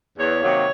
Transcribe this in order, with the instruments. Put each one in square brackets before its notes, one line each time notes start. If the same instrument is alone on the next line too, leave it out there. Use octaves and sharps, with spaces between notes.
[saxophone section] E2 C#5
C3 D#3 F#3 A#3